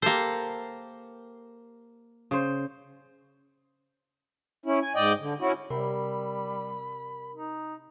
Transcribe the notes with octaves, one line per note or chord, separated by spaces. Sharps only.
A#3 G4 A4 C5
C#3 C5
C#4 E4
G#5
G#2 D5 D#5 G5
D3
C#4 E4 F#4
C3 G3 A#4 B5
D#4